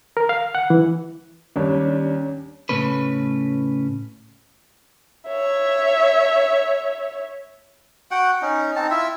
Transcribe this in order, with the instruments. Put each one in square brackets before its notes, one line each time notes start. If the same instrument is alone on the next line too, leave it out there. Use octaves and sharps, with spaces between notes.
[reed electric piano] A#4
F5
F#5
E3
[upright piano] D#2 G3 [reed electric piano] C#4 D4 C#5
[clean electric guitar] A2 C#3 A3 C#4 B4
[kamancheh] C#5 E5
[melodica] F#4 F#5 G5
C#4 D#4
C4 D#4 A5
E4 F4 E5